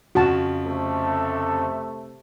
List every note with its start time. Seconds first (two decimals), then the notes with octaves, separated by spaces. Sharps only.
0.15 F2 C#3 F#4 A5
0.66 C3 A3